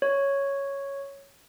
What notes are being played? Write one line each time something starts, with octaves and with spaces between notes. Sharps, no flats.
C#5